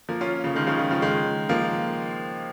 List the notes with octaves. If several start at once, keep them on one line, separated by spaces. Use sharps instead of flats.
F3 A#3
C#4 F4
C#3 F3
D#3 G#3
C#3 F3
D#3
C#3 F3
D#3 G#3
F3 A#3